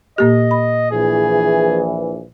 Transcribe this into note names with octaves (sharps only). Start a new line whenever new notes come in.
A#2 A#3 G4 D#5
B5
A#1 E3 G#4